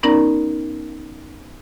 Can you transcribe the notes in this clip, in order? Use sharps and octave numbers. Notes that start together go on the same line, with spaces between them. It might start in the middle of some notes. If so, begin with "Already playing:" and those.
B3 C#4 D#4 A#4 D5 A#5